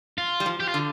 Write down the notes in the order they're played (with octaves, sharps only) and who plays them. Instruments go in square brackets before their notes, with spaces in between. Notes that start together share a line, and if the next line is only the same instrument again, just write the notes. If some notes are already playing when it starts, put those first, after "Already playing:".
[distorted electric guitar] F4
[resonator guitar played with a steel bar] G3
F3
[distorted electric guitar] G4
F4
[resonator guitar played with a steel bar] D3